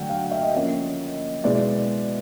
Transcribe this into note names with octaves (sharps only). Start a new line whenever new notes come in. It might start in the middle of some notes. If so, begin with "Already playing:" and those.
Already playing: D3 F#3 A3 F#5 G5
F5
E5
D#5
F3 A#3 C#4
B2 G#3 B3 E4 D5
D5